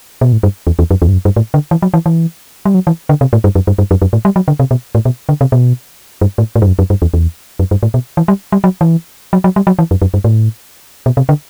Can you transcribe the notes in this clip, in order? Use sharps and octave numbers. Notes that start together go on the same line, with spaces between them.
B2
A2
G2
E2
E2
F#2
E2
G2
F#2
G2
A2
D3
E3
F#3
E3
E3
G3
F#3
E3
D3
C3
A2
G2
F#2
G2
G2
F#2
F#2
A2
G3
F#3
D3
C3
B2
A2
B2
D3
C3
B2
G2
A2
A2
G2
F#2
F#2
G2
E2
E2
F#2
G2
A2
B2
E3
G3
G3
F#3
E3
F#3
F#3
G3
F#3
E3
F#2
F#2
G2
A2
B2
C3
D3